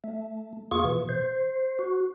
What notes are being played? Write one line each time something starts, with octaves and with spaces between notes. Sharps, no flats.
A3
E2 A#3 F4 G#4 C#6
B2 E3
C5
F#4